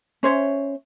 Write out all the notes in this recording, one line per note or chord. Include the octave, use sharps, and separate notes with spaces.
C#4 C5 C#5 E5